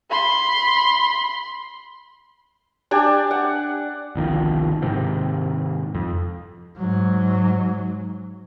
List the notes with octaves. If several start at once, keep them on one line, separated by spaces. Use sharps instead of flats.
B5 C6
D4 G4 D5 G#5
F#5
G1 C2 D#3 F3
G#2 C3 D#3
F2
G#2 F#3